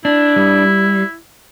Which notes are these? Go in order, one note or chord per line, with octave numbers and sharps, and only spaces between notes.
D4 E4
G3